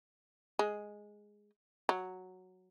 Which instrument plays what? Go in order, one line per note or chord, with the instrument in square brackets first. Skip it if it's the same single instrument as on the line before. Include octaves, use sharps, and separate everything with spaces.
[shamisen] G#3
F#3